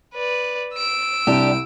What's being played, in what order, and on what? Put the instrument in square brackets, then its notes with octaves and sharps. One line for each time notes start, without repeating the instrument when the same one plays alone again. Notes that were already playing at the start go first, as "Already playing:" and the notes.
[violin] B4 D5
E6 D7
[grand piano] C2 [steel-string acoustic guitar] D4 G4